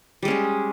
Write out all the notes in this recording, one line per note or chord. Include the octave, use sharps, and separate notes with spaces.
G3 G#3 C#4 G#4